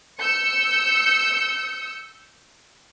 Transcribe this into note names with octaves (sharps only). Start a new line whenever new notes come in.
E6 G6 C#7